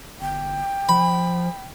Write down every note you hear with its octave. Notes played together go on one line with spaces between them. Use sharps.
G1 G5
F3 B5